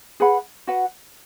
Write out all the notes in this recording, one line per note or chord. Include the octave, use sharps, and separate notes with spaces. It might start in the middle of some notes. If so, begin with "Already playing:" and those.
G#4 B4 F#5 B5
F#4 B4 F#5